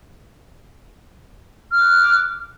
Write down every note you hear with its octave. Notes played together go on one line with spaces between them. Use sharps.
D6 F6 F#6